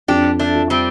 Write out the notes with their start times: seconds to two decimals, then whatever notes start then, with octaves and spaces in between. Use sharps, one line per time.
0.08 F2 D4 G4
0.39 A3 D4
0.55 F3
0.70 G3 C4